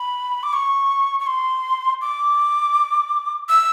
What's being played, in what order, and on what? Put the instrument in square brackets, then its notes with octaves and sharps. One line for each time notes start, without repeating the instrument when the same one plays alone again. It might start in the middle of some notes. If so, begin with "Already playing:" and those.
Already playing: [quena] B5
D6
C#6
C#6
C6
D6
E6